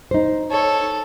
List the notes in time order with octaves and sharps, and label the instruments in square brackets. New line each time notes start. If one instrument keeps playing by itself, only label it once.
[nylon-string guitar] D#4 C5
[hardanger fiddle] A4 C#5